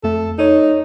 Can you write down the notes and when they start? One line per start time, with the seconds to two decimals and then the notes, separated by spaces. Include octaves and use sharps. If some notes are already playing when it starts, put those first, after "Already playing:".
0.04 F2 A3 A4
0.38 D#4 A4 C#5